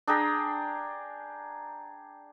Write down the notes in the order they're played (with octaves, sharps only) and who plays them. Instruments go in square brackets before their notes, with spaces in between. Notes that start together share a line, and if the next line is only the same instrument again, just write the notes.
[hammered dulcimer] D4 G#4 G5 A#5